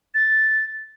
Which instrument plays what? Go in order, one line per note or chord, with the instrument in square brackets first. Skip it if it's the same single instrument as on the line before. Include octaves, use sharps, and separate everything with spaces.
[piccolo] A6